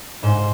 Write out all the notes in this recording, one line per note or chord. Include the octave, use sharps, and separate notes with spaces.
G#2 C5